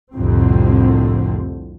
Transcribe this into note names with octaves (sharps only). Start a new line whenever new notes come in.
C2 F2 A2 D3 C4